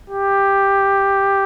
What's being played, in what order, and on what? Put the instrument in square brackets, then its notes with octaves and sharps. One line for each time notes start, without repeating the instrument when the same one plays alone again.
[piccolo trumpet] G4